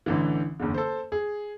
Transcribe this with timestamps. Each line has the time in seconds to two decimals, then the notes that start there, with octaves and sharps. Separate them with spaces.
0.06 A1 D3 E3
0.60 F#1 E2 D3
0.74 A4 C5
1.12 G#4